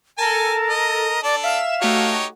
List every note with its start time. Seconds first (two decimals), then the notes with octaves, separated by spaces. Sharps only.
0.18 A4 A#4 G#5 A5
0.70 D#5
1.23 D4 A4 D5
1.43 E5 F5 E7
1.82 A3 D#4 F#4 G4 C#5